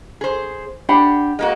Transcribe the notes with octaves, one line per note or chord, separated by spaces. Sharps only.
G#4 C5
D4 G4 F#5 B5
G#3 A#3 F#4